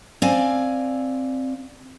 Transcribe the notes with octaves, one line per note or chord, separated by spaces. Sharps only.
C4 D5 F5 G#5